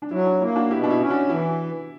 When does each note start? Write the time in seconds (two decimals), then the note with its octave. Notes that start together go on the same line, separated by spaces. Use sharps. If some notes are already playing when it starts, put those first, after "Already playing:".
0.02 D4
0.11 F#3 E4
0.26 D4
0.41 A#3 E4
0.56 D4 F#4
0.70 B2 E4 G4
0.83 D4
0.90 E4
1.00 C#4
1.10 D4 F#4
1.29 E3 E4